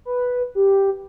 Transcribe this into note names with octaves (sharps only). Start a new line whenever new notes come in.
B4
G4